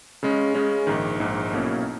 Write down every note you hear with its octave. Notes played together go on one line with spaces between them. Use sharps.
C#3 G#3 C#4
C#3 G#3 C#4
A#1 G#2 D#3
A#1 G#2 D#3
B1 B2 A#3 C#4 E4